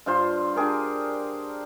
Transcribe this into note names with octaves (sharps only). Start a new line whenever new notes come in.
G2 F4 C5 C6
D4 G4 G#4 A#4